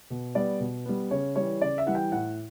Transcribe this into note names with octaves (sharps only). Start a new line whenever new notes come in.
B2
G3 B3 D5
B2
G3 B3
C#3 C#5
E3 G3 C#5
C#3 D5
E5
E3 G3 F#5
G5
A2 F#5